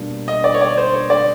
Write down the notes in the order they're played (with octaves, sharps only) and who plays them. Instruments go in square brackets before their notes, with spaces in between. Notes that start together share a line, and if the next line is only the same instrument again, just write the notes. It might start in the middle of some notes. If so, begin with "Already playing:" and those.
Already playing: [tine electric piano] B2 G3 A#3 D4
[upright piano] D#5
D5
C#5
D5
C5
C#5
D5